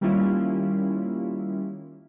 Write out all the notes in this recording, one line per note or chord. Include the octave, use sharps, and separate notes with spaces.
D#3 G3 A#3 C#4 E4 F4